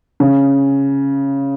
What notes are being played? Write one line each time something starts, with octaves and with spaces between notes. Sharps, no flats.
C#3